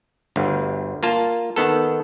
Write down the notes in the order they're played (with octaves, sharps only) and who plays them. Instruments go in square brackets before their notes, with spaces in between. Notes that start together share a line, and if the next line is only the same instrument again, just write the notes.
[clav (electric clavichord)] G1 D2
A#3 F4 A5
D#3 B3 A4